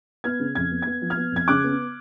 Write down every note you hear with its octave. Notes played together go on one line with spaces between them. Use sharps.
B3 F6 G#6
C#3
F2 G#6
B3
B3 G#6
F3
F6 G#6
B3
F2 G#6
C#3 D6 F#6
B3